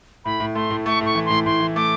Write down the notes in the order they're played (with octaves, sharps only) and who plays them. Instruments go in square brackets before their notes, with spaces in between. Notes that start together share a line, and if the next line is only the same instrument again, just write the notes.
[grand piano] A2 [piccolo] B5
[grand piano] A2
[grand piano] A3 [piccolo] C6
[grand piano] A2
[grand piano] A3 [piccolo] C#6
[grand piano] A2 [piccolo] C#6
[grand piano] E3
[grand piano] A2 [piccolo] C6
[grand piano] A2 [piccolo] C6
[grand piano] E3
[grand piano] A3 [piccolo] D6